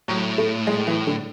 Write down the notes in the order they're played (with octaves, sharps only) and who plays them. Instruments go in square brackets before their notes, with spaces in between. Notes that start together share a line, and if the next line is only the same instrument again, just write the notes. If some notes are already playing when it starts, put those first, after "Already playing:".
[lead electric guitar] A2 [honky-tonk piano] F#3
[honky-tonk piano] A3
G#3
E3
D3